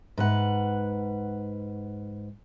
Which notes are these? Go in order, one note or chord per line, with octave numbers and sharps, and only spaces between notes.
G#2 B4 F#5